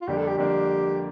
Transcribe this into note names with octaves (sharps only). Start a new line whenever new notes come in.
F4
F2 D3 G3 A#3 D4 G4
A4
G4
F2 D3 G3 A#3 D4 G4